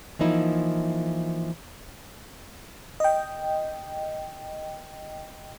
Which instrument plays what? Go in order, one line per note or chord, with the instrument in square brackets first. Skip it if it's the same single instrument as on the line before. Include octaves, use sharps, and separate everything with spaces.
[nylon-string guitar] E3 F3 A#3 D#4 E4
[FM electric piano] D#5 G5